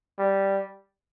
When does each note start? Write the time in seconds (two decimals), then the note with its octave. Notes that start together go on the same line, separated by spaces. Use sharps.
0.19 G3